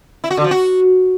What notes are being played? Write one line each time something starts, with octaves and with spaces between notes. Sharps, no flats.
E4
F#4
D3
F3
F#4